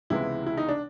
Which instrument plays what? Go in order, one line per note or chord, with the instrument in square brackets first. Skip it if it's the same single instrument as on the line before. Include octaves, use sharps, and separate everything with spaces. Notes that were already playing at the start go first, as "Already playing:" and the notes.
[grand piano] C#2 C3 E3 G#3 B3 [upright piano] E4
[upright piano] E4
D#4
D4